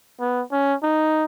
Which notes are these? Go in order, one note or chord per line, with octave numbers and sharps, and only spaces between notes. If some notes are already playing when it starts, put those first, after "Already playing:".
B3
C#4
D#4